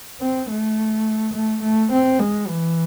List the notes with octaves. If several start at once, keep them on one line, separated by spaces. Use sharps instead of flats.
C4
A3
A3
A3
C4
G#3
E3